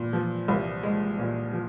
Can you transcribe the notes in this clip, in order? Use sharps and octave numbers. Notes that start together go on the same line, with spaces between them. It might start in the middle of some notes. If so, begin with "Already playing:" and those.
Already playing: A#2
F3
C2
G#3
A#2
F3